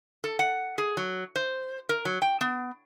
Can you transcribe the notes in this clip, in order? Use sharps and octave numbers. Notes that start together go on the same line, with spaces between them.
A4
F#5
G#4
F#3
C5
A#4
F#3
G5
B3